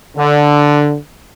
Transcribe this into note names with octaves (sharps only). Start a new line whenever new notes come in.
D3